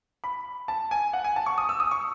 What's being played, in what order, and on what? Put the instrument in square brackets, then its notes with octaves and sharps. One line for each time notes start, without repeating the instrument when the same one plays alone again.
[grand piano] B5
A5
G#5
F#5
G#5
A5
C#6
D#6
E6
D#6
C#6